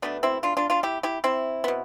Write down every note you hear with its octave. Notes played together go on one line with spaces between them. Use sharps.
B2 A3 B3 D4
C4 E4
D4 F4
D4 F4
D4 F4
E4 G4
E4 G4
C4 E4
B2 B3